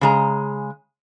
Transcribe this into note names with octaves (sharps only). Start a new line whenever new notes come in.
C#3 G#3 A#5